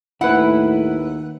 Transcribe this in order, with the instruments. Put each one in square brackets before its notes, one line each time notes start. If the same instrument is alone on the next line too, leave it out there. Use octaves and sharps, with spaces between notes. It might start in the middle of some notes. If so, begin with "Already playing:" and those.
[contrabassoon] D#2 [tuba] A2 [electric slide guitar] E4 B4 [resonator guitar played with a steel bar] F#5